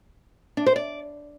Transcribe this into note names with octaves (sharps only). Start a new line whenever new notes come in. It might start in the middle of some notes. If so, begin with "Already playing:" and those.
D4
C5
D5